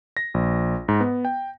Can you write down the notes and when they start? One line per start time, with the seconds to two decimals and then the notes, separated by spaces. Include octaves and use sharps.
0.17 A#6
0.34 A#1
0.88 G#2
1.01 B3
1.25 G5